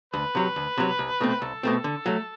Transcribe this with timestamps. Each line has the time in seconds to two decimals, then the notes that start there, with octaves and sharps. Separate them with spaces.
0.14 D2 B4
0.35 C3 F#3
0.56 D2
0.78 C3 F#3
0.99 C2
1.21 B2 A3 C4
1.42 C2 A4
1.63 B2 A3 C4
1.84 D3
2.06 F#3 A3